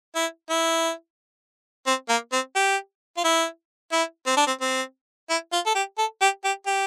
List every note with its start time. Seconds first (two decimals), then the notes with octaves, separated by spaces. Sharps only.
0.15 E4
0.50 E4
1.87 C4
2.09 A#3
2.32 C4
2.55 G4
3.17 F4
3.24 E4
3.92 E4
4.27 C4
4.37 D4
4.47 C4
4.61 C4
5.30 E4
5.52 F4
5.66 A4
5.75 G4
5.98 A4
6.21 G4
6.44 G4
6.67 G4